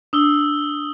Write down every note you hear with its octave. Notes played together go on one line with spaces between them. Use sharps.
D4 D#6 E6 G7